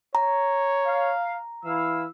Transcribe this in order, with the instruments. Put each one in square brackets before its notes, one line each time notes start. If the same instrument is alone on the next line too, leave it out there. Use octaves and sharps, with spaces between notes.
[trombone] C#5 [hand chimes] A#5
[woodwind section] F5
[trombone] E3 [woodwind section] E4 F5 E6